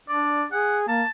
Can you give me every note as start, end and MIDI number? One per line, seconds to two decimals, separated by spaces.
0.09 0.45 62
0.09 0.45 74
0.52 0.88 68
0.52 0.78 78
0.88 1.03 58
0.88 1.10 81